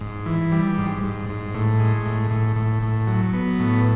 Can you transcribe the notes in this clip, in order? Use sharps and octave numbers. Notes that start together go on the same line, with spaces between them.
G#2
E3
G3
G#2
G#2
G#2
A2
G#3
A2
A2
A2
A2
F#3
B3
A2